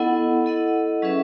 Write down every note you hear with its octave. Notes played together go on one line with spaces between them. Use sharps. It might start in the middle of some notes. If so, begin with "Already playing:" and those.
Already playing: B3 E4 A4 D#5 F#5
E4 A4 D#5 F#5
F#3 C#4 G#4 B4 E5